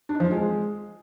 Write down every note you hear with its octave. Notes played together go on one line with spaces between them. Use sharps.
D4
D#4
F3
F4
G#3